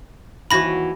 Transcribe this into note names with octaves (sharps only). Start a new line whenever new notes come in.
D#2 E3 F#4 B5 A#6